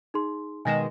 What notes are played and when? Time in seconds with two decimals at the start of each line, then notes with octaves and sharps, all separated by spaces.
0.14 D#4 G#4 C6
0.65 B2 D#3 G#3 G#5 A#6 E7